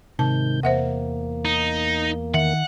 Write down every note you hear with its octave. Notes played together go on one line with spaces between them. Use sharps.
G#2 C3 D#3 A5 G6
E2 A#3 C5 E5 F#5
D#4
D#3 E5 F#5